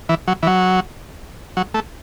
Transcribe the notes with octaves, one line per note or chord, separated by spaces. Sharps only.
E3
F#3
E3
F#3
F#3
A3